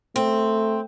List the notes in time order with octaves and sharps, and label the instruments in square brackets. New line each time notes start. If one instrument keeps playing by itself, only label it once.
[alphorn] A3 [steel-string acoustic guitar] C4